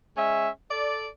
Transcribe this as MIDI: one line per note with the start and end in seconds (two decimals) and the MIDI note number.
0.15 0.48 56
0.15 0.48 61
0.15 0.48 76
0.71 1.07 69
0.71 1.07 74